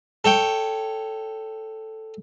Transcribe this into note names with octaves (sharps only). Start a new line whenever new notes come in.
A4 C#5 G5